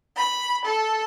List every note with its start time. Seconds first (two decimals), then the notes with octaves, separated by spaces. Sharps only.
0.16 B5
0.65 A4